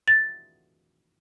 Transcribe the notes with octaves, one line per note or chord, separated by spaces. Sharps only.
A6